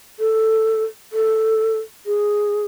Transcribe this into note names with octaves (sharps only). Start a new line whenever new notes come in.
A4
A4
G#4